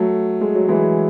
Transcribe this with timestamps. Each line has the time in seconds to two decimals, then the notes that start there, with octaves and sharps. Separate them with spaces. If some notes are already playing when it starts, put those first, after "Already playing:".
Already playing: F#3 A3
0.41 G#3
0.55 F#3
0.68 E3 G#3